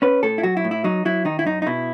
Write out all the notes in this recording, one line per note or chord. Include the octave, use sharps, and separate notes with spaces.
C#4 B4
A2 A4
E4
F#3 F#4
E4
A2
E4
F#3 D#4
F#3 E4
D#3 D#4
E4
F#2 D#4
D#4
B2 E4